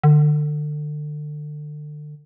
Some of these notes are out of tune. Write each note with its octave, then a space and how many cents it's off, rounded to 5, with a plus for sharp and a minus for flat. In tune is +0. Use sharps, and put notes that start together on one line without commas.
D3 +30